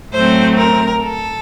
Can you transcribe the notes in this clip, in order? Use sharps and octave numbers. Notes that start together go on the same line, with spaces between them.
A2 F#3 A3 C4 C5
A#4
A4